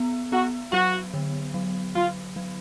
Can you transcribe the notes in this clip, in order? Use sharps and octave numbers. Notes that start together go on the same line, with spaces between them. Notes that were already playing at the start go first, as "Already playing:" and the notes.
Already playing: B3
B3 F#4
F#3 F#4
D3
F#3
F#3 F4
F#3